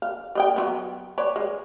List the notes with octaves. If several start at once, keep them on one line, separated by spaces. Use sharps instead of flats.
F5
G3 D#5 G5
F#3 A3 B3
B4 C#5 D5
G#3